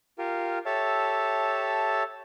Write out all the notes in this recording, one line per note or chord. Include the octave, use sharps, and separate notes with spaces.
F4 G4 A#4
G4 A4 C#5 E5 A5